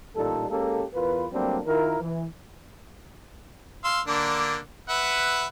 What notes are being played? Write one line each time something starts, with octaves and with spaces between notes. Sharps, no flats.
A1 A#2 G3 D#4 A4
G#3 A#3 C#4 G4 A4
E2 F4 A#4 B4
F#3 G3 A3 A#3 C4 D4
D#3 E4 F4 A#4
E3
F5 C6 E6
D3 A#3 D4
B4 E5 F#5